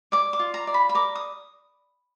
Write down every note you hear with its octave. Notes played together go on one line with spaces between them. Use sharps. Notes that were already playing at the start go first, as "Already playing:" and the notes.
D5 D6
D6
F4
A#5
D5
B5
B5
A#4 D6
D#6